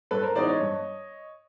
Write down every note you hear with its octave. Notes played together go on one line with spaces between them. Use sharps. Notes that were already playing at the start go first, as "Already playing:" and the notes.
G2 A4 B4
A#4 C5
E3 G#3 B3 D#4 C5 D5
C#5 D#5
G2